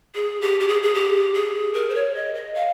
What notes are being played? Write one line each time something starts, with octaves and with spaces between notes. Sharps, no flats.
G#4
G4
G4
G#4
G#4
G4
G#4
A#4
C5
C#5
D#5
D#5
F5